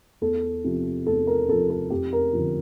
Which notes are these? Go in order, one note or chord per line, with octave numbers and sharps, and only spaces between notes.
E2 A4
C3 F3
E2 A4
A#4
C3 F3 A4
A4
F2 G4
A#4
D3 F3